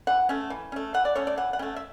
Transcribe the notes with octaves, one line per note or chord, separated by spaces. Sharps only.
E3 F#5
A3 C#4
E3
A3 C#4
E3 F#5
D5
A3 C#4 C#5
D5
E3 F#5
F#5
A3 C#4 G5
E5